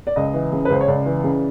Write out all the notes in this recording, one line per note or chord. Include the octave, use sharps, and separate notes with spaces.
D5
C#2 D#5
E3
C#3
B4
C#2 C5
C#5
C#2 D5
E3
C#3